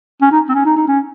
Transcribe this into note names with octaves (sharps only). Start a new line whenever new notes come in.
C#4
D#4
C4
C#4
D#4
D#4
C#4